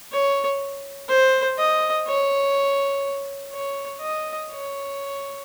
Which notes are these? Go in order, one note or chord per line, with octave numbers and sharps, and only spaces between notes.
C#5
C5
D#5
C#5
C#5
D#5
C#5